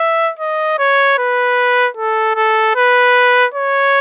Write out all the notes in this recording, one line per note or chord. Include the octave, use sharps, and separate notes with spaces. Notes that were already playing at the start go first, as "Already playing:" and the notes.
Already playing: E5
D#5
C#5
B4
A4
A4
B4
C#5